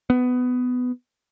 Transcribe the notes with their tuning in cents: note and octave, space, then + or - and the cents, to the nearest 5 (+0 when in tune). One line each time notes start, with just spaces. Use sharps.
B3 +15